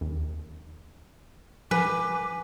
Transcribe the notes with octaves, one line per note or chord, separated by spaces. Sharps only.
D#2
F3 B4 G#5 D6